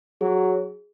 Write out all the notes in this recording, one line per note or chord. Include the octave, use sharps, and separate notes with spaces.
F#3 G#4